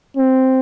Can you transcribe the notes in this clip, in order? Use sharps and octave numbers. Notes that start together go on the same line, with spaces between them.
C4